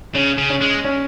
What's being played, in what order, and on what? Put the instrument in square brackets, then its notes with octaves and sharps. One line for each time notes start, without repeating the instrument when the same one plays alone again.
[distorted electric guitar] C#3 [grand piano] C#4
[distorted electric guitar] C#3
[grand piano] C#4
[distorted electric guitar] G#3
[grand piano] C#4